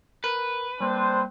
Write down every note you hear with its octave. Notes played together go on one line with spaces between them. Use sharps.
A#4 B4
G3 A#3 C4 D4 C5